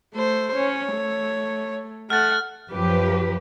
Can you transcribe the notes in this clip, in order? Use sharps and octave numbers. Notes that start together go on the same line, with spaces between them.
A3 C5
C#4 C#5
A3
A3 F#5 F6 A6
F#2 F3 G4 B4